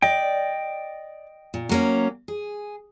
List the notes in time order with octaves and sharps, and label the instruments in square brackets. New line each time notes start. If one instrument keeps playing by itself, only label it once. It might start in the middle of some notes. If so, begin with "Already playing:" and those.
[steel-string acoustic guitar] D5 [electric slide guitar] D#5 G5
[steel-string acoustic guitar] A#2
F#3 A#3 C#4
G#4